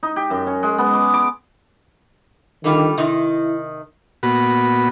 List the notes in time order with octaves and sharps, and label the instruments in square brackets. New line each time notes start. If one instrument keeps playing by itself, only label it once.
[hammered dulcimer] D#4
G4
F#2
C#4
G#3
B3
D6
D6
[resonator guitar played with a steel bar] D3 G3 F4 [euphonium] D#3
[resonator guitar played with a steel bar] C3 D#3 D#4 [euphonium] E4
[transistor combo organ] A#2 B3 F#4 B5